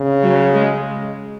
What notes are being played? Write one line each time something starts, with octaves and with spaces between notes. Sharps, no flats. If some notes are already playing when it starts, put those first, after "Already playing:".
Already playing: C#3
F#3
G#3